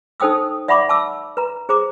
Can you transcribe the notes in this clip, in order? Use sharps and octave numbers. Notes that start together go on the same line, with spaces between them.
D#4 A4 C5 G5 D#6 E6
D5 E5 F#5 B5 C#6 D6
A5 D6 E6
B4 A#5
G#4 C5 A#5 D6